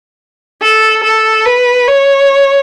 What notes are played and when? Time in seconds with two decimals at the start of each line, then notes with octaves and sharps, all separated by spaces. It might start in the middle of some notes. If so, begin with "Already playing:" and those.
0.62 A4
1.04 A4
1.46 B4
1.87 C#5